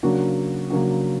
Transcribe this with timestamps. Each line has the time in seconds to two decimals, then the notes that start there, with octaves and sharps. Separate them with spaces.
0.03 C#3 F#3 A#3 D4 F#4
0.70 C#3 F#3 A#3 D4 F#4